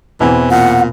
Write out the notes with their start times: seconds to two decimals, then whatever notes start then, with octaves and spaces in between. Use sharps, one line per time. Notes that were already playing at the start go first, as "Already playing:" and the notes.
0.20 E2 B2 E3 C4 G#5
0.51 A#2 F#5